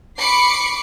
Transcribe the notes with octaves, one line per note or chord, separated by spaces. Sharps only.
B5 C#6 D6 C7 C#7